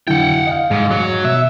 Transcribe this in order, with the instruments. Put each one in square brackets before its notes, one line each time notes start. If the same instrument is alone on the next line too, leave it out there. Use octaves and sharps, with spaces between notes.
[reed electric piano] D3 F#3 E4 [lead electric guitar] F#5 G5
[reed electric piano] D#5 F5
[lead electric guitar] G#2
F#3
[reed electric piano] B2 [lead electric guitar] E5